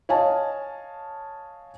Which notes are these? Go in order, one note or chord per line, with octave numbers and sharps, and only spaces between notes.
C#5 D#5 F5 G#5 A5